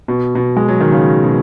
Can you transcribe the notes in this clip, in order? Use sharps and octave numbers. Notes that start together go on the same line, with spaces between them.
B2
B2
G#3
F#3
D#3
C#3
B2